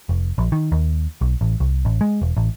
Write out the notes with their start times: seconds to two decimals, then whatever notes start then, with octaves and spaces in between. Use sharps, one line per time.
0.09 F1
0.38 A#1
0.52 D#3
0.72 D#2
1.21 B1
1.41 A1
1.60 C2
1.85 A1
2.01 G#3
2.22 E1
2.37 A1